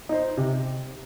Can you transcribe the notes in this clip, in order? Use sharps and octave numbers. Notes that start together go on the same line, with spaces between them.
D#4 C5
C3